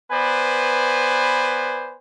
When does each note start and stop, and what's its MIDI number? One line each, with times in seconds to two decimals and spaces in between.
0.12 1.97 59
0.12 1.97 71
0.12 1.97 72
0.12 1.97 74
0.12 1.97 80